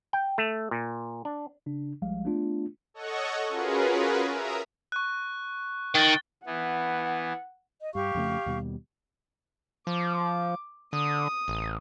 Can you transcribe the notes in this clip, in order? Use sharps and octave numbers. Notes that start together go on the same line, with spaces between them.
G5
A3
A#2
D4
C#3 D4
A#1 F3 G3 G#3 F5
A3 B3 D4 F4
A4 C#5 D#5 F#5 C#6
C#4 F4 F#4 G#4 A#4 B4
A#4 E5 A#5 D#6
C#6 F#6
D#3 A6 G7
E3 B3 F#5
D#5
G2 G4 F5 C#6
F2 C#3 A3
D#2 B2 G3
F3 D6
D3 D#6
A1